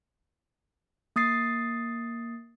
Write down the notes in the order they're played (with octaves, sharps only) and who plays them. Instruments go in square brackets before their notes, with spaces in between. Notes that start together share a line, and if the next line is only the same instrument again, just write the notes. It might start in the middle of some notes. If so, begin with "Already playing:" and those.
[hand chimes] A#3 D#6 A6 C7